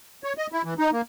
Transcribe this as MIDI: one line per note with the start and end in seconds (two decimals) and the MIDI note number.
0.24 0.33 73
0.38 0.47 75
0.52 0.62 64
0.64 0.74 52
0.79 0.91 63
0.93 1.01 58